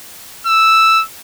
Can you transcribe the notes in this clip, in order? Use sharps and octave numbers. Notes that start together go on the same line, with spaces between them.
E6